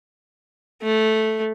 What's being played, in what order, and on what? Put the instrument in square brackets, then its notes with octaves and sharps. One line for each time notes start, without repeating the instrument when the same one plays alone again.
[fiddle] A3